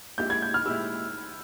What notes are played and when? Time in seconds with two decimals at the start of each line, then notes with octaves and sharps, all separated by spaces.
0.18 A#1 A#2 G#3 E4 G4 G6
0.30 G#6
0.42 G6
0.54 F6
0.65 A#2 G#3 E4 G4 E6